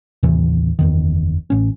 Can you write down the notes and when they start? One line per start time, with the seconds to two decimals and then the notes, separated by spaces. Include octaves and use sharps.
0.23 A1 D#2 C3 E3
0.79 F#1 E2 D#3
1.50 A1 C#4